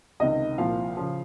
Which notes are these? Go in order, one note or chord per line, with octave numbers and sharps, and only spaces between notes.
C#2 C3 D#3 D#5
C2 A#2 F3 F5
C#3 F3